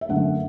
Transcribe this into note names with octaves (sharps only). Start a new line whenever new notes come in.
E5
F#2 D3 A3 F#5